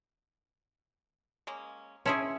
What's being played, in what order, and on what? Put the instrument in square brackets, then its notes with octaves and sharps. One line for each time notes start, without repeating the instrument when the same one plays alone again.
[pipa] G#3 A#3 C#4
[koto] C#4 E4 G#4 [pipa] C#5 A5 C6